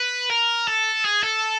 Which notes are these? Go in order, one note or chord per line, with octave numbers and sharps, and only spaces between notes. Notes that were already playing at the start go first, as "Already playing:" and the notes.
Already playing: B4
A#4
A4
G#4
A4